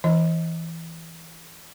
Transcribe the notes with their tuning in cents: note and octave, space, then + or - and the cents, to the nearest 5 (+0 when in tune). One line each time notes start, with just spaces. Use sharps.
E3 +0 D#5 +20